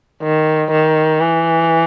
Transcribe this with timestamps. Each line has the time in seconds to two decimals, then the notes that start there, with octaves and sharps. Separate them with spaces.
0.23 D#3
0.72 D#3
1.20 E3